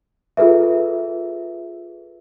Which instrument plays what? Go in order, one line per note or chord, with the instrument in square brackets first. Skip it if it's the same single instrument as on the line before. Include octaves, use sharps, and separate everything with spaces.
[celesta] F4 G#4 A4 B4 E5